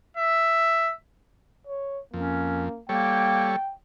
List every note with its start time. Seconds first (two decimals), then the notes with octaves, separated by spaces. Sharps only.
0.17 E5
1.67 C#5
2.14 F2 A#3 C#4
2.89 G3 A#3 A4 C#5 G5